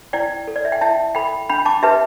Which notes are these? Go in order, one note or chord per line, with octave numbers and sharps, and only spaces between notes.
E4 D5 G5
A4
D5
E5
G5
E4 E5 A5
A4 G5 B5
D4 G5 B5
A5 D6
G4 B4 E5 A5